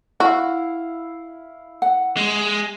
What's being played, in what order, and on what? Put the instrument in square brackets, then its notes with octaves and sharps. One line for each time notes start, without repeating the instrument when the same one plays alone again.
[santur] E4 F5 [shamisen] F#4
[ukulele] F#5
[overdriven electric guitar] G#3